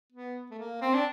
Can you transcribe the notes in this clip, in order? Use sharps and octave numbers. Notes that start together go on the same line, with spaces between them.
B3
A3
A#3
C4
D4